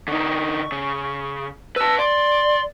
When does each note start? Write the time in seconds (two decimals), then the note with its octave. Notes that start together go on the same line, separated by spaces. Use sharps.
0.08 D3 D#4 C#6
0.72 C#3
1.76 B4 A5 E6
1.99 D5 C6